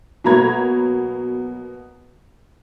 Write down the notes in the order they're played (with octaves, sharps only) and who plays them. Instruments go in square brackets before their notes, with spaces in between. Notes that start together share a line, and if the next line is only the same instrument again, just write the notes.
[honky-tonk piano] B2 F#3 A#3 A#5 B5 G#6